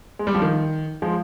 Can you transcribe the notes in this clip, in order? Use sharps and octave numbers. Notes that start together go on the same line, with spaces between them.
G#3
G3
F3
D#3
F3 G#3